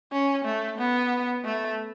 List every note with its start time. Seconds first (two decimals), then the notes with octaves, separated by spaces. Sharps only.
0.12 C#4
0.45 A3
0.78 B3
1.44 A3